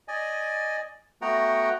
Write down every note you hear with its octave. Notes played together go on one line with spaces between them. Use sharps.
D5 D#5 G#5
A3 B3 F#4 F#5 G5 A#5